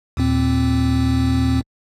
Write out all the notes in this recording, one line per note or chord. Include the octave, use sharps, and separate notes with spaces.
D#2 A#2 C4